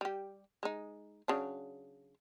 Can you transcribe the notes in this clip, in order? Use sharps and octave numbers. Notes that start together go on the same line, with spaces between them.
G3 G4
G#3 D#4
C#3 F#3 D4